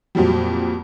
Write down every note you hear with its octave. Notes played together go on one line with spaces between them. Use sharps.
F2 A#2 F#3 G3